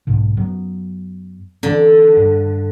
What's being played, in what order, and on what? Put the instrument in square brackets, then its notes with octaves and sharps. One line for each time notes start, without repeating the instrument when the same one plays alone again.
[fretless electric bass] B1 G#2 D3
F#2 F#3 B3
[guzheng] D3 [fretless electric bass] E3 C4
[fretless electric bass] G2